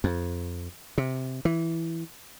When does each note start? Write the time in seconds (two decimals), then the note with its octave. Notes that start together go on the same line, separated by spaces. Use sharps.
0.04 F2
0.98 C3
1.45 E3